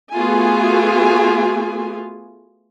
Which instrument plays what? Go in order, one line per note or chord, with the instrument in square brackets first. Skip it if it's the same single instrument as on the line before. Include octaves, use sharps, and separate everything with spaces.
[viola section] A3 B3 F4 F#4 G#4 G#5